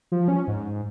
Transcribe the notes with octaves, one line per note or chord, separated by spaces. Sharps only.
F3
C#4
G#2